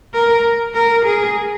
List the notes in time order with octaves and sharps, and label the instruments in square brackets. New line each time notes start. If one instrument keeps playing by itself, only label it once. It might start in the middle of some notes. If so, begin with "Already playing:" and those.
[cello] A#4
A#4
G#4